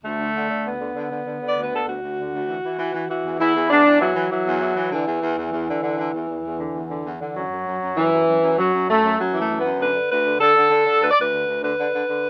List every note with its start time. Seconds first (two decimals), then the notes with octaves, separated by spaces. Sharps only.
0.04 D2 A3
0.20 D3
0.35 D3
0.50 D3
0.65 D2 B3
0.80 D3
0.96 D3
1.11 D3
1.26 D3
1.41 D3
1.47 D5
1.57 D2 B4
1.72 D3 A4
1.87 D2 F#4
2.02 D2
2.18 D3
2.33 D2
2.49 E3
2.64 E3
2.79 E3
2.94 E3
3.09 E3 F#4
3.24 E2
3.40 E2 E4
3.55 E2
3.70 E2 D4
3.85 E2
4.01 E3 F#3
4.16 E3
4.31 E3 F#3
4.46 E2
4.61 E3
4.77 E3
4.92 D3 E3
5.07 E2
5.23 E2
5.38 E2
5.53 E2
5.68 D3
5.83 D3
5.99 D3
6.14 E2
6.29 E2
6.44 E2
6.60 D3
6.75 E2
6.90 D3
7.05 E2
7.21 D3
7.36 F#2 F#3
7.51 F#2
7.66 F#2
7.82 F#2
7.96 F#2 E3
8.12 F#2
8.28 F#2
8.42 F#2
8.58 F#2 F#3
8.73 F#2
8.88 F#2 A3
9.03 F#2
9.19 F#2 F#3
9.34 E3 A3
9.49 F#2
9.59 F#2 B3
9.79 D3 B4
9.95 D3
10.10 D2 B4
10.25 D3
10.40 D3 A4
10.56 D3
10.71 D3
10.86 D3
11.02 D2 B4
11.11 D5
11.17 D2 B4
11.32 D3
11.47 D2
11.62 D3 B4
11.78 D3
11.93 D3
12.08 D3